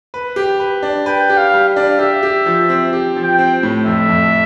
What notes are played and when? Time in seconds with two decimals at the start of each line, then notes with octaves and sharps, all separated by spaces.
0.14 B4
0.36 G4
0.60 B4
0.83 D4
1.06 B4 G5
1.30 G4
1.37 F5
1.53 G3
1.68 F5
1.76 D4
1.99 G4 E5
2.23 G4
2.46 F3
2.69 C4
2.93 G4
3.16 F3
3.23 G5
3.39 C4
3.63 A2
3.86 F2 E5
4.09 F2